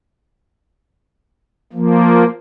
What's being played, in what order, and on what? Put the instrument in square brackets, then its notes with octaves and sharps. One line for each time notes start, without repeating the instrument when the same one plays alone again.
[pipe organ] F3 A#3